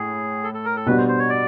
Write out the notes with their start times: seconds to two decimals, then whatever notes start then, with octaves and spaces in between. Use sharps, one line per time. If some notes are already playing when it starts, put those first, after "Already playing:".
Already playing: A2 G#4
0.43 A4
0.54 A4
0.65 A#4
0.76 A4
0.86 B2 G3 B3 D4 F#4 B4
0.98 C5
1.08 C5
1.19 C#5
1.29 D5